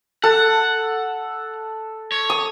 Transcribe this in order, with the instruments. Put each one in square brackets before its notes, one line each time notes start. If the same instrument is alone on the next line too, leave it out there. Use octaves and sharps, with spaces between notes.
[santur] A4 [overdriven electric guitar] F#5
[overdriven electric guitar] C#5
[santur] D#6